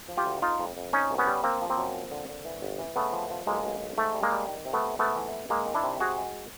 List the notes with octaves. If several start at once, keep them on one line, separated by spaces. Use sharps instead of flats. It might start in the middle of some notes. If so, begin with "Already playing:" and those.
F3
F4 G4
D2
F2 D#4 F4
F2
F2
A#2 C#4 D#4
C2
B3 C#4
G3
F3 A#3 C4
F3
A#3 C4
F#2
F3
D3
D3
E3
G1
E3
C#3 A3 B3
F3
F3
B1 G#3 A#3
B1
B1
G#2 A3
G3
G#3 A#3
G3
D#3
C3
A3 B3
C3
G#2 A3 B3
E3
E3
D#3 G#3 A#3
D#3
D4 E4
C3
G#2 F#4 G#4
G#3